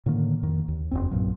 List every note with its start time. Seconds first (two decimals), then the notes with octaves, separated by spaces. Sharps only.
0.06 A2 D3 D#3 A#3
0.43 F2 D#3
0.68 D#2
0.91 F#1 F2 C4
1.11 B1 G2 A#2 F#3